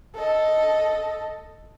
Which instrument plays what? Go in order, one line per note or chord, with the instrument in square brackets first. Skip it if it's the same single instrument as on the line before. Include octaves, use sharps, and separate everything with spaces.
[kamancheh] A4 D#5